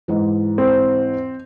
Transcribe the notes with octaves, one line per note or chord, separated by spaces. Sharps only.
G#2 E3
C4